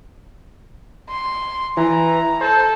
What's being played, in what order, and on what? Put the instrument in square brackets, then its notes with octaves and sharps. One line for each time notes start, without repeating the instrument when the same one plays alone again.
[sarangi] C6
[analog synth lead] E3 [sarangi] A#5
[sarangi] A4 [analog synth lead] C5